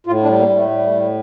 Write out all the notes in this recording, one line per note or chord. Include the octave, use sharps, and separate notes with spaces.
A2 F4
D4
G3
A#3
A2
A3
G3
A2